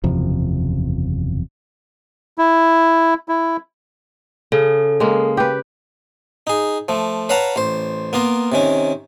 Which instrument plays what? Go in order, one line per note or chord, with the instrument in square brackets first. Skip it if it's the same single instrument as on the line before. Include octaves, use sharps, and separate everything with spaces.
[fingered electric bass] F#1 E2 C3 F3
[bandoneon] E4
E4
[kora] C#3 [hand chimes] A4
[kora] G#3 A#3
G4 B4
[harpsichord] D#4 G#4
F3 A3
B4 C#5 F5 F#5 A5 A#5
A1 C5
A#3 B3 F4 A#4
C3 D#3 C#4